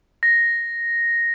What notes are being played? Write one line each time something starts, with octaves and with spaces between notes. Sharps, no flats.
A#6